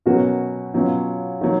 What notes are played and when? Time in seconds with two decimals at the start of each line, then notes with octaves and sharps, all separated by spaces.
0.06 B2 F#3 C#4 F#4 A#4
0.74 B2 F#3 C#4 F4
1.41 D#3 F#3